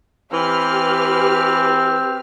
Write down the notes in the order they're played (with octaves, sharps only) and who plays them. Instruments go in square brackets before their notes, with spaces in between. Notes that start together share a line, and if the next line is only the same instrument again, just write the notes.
[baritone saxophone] E3 [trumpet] C4 [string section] G4 B4 F6